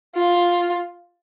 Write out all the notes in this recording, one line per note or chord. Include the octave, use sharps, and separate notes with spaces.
F4